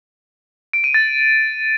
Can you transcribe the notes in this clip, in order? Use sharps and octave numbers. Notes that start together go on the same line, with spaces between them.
D7
D#7
A6